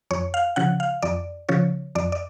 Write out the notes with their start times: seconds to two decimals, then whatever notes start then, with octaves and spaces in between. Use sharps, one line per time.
0.11 F2 C#5
0.34 F5
0.56 C#3 F3 F#5
0.80 F5
1.02 F2 D5
1.49 C#3 F3 C#5
1.95 F2 D5
2.12 D5